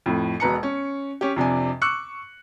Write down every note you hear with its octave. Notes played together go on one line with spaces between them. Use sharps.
F2 A2
E1 B2 B4 A#5 C#7
C#4
C#4 G4
F2 C3 D4 G#5
C#6 D6 E6 F#6 C#7